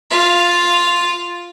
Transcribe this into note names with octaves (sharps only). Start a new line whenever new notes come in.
F4 F5